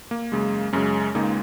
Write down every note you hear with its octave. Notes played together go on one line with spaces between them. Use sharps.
A#3
F#2 C#3 G#3
F#2 C#3 G#3 C#4
C#2 C#3 G#3 A#3 D#4